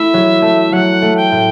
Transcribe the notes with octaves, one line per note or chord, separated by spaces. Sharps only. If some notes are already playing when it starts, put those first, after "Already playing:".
Already playing: A3 E4 E5
F#3
A3
F#3 F#5
A3
G5
A2